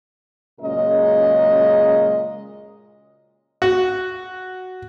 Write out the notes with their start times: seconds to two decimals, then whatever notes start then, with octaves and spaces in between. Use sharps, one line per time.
0.61 F#2 A#2 C#3 G#3 A#4 D#5
3.62 F#4